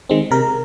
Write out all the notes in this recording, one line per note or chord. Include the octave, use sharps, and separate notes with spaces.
D#3 G#3 C4
C3 A#4